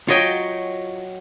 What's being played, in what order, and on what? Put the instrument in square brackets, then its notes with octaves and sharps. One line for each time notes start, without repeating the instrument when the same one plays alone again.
[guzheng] F#3 D#5 G5 [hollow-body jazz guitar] F4 F#4 C#5